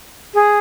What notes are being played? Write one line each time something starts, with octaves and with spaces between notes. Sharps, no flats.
G#4